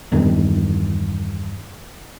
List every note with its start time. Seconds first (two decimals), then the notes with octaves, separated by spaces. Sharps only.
0.12 E2 G2 D#3